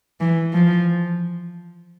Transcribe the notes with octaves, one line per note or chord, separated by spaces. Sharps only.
E3
F3